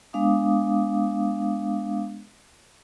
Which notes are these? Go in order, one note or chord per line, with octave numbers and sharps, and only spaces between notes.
G#3 B3 D4 F5 D6 D#6